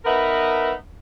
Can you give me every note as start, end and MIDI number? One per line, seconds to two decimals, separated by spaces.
0.05 0.72 59
0.05 0.72 63
0.05 0.72 70
0.05 0.72 71
0.05 0.72 76
0.05 0.72 78